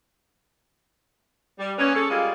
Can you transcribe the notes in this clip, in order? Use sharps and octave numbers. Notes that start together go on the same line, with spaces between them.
G3
A#3 B3 C#4
C#4 G#4 A4
G3 G#3 A#3 F4 G#4